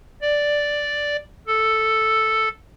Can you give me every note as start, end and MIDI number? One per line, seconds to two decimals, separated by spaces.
0.22 1.16 74
1.47 2.48 69